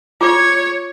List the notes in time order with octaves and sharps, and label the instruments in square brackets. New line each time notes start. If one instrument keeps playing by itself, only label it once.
[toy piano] F4 D6 [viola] C#5